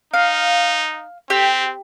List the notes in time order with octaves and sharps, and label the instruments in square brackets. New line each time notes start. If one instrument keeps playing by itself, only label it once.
[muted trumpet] D#4 [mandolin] F5
[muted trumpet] C4 [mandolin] G4